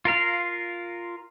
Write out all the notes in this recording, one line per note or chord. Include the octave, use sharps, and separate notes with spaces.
F4 A#4 F5